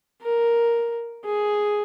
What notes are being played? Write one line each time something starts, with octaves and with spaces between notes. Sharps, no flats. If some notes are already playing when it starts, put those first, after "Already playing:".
A#4
G#4